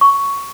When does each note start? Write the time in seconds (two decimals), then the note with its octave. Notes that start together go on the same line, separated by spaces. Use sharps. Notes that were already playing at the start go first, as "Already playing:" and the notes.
0.01 C#6